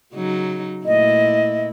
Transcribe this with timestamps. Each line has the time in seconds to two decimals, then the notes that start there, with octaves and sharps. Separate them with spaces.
0.13 C#3 F#3 D#4
0.86 A#2 A3 E4 D#5